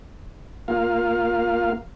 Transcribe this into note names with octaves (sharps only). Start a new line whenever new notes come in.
A#3 F4 F5